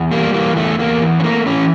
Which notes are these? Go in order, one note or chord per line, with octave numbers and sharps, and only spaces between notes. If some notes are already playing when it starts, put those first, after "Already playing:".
Already playing: E2
G3 A#3
E3 A#3
E2 A3
E2 A#3
E3
C#4
A3 A#3
E3 C#4